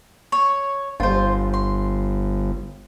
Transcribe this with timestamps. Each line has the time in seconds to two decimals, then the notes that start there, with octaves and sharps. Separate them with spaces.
0.32 C#5
1.00 G1 F4 C5
1.54 C6